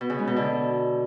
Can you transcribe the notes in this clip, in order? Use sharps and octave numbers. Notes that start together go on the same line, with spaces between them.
B2
C#3
G#3
B2
D3